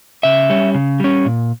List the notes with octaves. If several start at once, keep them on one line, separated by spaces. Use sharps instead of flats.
C#3 E5
G3 C#4
C#3
G3 C#4
A#2